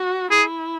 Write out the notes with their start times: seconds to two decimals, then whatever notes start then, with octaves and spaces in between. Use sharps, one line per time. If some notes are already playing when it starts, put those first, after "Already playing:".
Already playing: F#4
0.31 E4 G#4